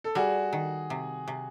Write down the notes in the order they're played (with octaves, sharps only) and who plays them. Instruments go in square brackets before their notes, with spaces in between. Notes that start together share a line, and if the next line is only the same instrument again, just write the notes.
[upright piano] A4
[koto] G3 [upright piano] F#4 G#4
[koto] D#3
C3
C3